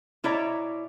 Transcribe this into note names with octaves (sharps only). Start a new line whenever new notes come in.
B2 E4 C#5 D5 E5 A#5